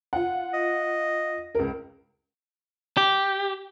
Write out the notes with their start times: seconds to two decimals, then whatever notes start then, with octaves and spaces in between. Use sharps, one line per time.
0.13 F4 F#5
0.54 D#5
1.55 C#2 A#4
2.97 G4